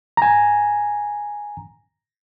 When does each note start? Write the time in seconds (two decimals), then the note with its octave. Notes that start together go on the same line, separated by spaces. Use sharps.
0.17 G#5 A#5